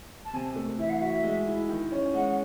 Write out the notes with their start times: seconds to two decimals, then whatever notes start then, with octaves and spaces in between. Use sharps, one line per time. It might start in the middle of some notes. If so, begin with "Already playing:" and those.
0.24 A5
0.33 C3 G#5
0.56 A3
0.78 E3 E5
0.89 F#5
0.99 F#4 E5
1.23 G#3
1.47 E4
1.69 D#3
1.92 C#4
2.14 G#3 F#5